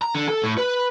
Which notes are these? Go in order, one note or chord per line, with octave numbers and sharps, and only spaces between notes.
A#5
D3
A4
A2
B4